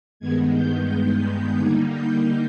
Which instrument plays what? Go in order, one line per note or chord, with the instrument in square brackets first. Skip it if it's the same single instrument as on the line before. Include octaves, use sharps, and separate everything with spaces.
[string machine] G2 D#3 G#3 B3 G#6
G6
D3 G3 A#3 D#4 G#6
G6